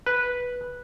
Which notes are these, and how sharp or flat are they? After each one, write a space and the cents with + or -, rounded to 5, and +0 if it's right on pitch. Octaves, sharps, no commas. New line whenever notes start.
B4 -5